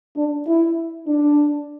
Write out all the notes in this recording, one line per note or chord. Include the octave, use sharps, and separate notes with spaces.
D4
E4
D4